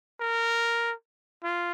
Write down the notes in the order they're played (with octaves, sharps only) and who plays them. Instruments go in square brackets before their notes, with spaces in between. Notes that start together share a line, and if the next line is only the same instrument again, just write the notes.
[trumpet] A#4
F4